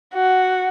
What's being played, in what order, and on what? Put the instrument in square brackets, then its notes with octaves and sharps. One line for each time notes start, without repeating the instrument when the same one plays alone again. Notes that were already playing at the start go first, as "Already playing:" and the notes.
[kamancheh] F#4